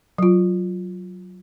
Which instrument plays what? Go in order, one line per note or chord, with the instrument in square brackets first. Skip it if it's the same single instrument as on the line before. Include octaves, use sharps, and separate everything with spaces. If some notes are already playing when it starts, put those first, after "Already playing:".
[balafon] F#3 F4